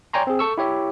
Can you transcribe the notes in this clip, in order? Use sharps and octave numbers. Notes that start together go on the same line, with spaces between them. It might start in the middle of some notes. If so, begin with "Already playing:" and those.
C#5 D5 G5 G#5 A#5 C6
C4 G#4
A4 C#6 E6
E4 G4 C#5 E5